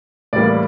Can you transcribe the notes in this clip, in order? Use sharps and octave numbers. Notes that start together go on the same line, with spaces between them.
A2 E3 G3 A#3 D5